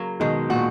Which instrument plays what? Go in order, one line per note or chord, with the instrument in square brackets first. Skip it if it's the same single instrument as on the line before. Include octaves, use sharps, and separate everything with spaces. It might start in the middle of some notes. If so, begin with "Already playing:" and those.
Already playing: [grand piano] C#3 [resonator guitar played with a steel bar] F#3 A#3
[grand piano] B2 D#3 [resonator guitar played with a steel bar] G#3
[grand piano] A#2 [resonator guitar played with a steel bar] F#4